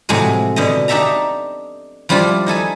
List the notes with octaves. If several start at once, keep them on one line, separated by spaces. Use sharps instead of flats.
A2 C3 F3 F#3 G#3
B2 D3 D#5
D4 D#4 G4 A4 E5 A#5
F3 G3 D4 E4 F4
D#4 E4 A4 G#5